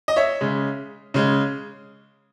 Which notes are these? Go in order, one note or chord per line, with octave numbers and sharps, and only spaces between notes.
D#5
C#5 E5
C#3 G#3
C#3 G#3